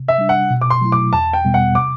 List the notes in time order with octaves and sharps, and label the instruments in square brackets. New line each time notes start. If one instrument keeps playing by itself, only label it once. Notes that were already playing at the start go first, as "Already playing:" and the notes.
Already playing: [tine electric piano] C3
[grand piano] E5
[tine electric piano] G3 D4
[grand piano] F#5
[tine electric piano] B2
[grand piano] D6
C6
[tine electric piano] F#3 A3 E4
[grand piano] D6
[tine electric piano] E2 [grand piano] A5
[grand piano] G5
[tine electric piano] B2 G3 B3
[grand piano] F#5
[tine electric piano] C3 [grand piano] D6